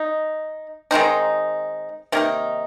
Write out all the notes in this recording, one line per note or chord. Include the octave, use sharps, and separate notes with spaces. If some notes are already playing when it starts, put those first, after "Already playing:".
Already playing: D#4
D#3 G#3 C4 D#4
C3 D#3 A#3 D#4